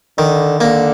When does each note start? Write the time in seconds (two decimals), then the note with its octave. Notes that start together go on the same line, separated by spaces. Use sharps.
0.18 D3 D#3
0.60 D3 A#3